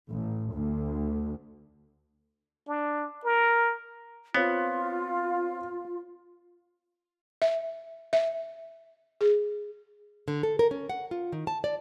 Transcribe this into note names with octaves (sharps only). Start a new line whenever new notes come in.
A1
D2
D4
A#4
B3 C4 F4 C#5 F5
E5
E5
G#4
D3
A4
A#4
C#4
F#5
F4
D#3
A5
D5